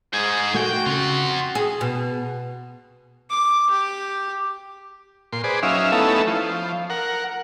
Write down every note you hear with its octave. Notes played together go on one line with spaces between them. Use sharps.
G#2 G#4 C5
A#2 A3 A#3 F#4 G5 G#5
C#3 C4 F4
G#4
B2
D6
G4
A#2 C6
G#4 B4 C5 D5
F#3 C#4 D#4 E5 F5
A3 B3 C#4 D#4 E4 A4
F3
A#4 F#5